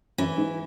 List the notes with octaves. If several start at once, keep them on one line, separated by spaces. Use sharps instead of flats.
F#2 E3
G#2